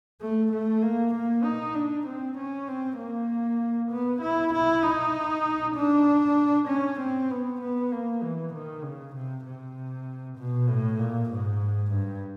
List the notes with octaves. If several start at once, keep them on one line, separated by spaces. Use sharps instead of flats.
A3
A3
A#3
A#3
D#4
D4
C4
C#4
C4
A#3
B3
E4
E4
D#4
D4
C#4
C4
B3
B3
A#3
E3
D#3
C#3
C3
C3
B2
A2
A#2
G#2
G2